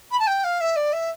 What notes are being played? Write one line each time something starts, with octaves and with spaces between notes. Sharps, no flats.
B5
A5
G5
F5
E5
D5
E5